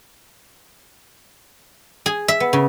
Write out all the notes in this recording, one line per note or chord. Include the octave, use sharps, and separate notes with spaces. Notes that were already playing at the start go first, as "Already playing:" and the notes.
G#4
E5
B3
C#3